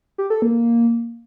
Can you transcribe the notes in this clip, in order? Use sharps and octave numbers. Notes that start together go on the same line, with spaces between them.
G4
A4
A#3